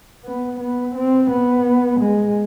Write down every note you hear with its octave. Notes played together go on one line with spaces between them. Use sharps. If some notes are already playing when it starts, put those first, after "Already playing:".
B3
B3
C4
B3
G#3